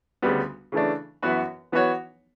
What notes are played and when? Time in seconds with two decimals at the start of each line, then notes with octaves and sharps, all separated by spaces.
0.22 D2 C#3 G3 B3
0.72 C#3 E3 A3 D4
1.22 F#2 E3 B3 F#4 B4
1.72 E3 B3 F#4 C#5